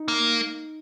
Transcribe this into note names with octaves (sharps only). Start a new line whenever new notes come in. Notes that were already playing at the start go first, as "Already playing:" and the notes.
Already playing: D#4
A#3